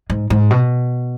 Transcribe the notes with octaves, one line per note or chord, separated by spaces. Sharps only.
G#2
G#2
B2